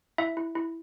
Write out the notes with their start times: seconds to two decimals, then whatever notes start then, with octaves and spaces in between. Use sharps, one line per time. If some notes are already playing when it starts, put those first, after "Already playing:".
0.18 E4 E5
0.37 E4
0.55 E4